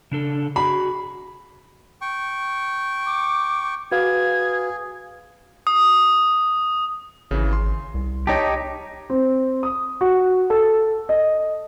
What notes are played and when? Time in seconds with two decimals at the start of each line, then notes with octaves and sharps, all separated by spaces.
0.11 C#3 D4 A4
0.56 F#4 G#4 B5
2.01 G5 C#6
3.06 D6
3.92 F#4 G#4 B4 F5 G#6
5.67 D#6
7.31 G#1 C#3 E3
7.53 C6
7.94 C2
8.27 D#4 G4 C#5 G5 A5
9.10 C4
9.63 D#6
10.01 F#4
10.50 A4
11.09 D#5